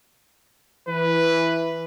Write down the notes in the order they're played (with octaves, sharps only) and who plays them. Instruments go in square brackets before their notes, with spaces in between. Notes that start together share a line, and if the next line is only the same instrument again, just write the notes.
[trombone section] E3 [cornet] B4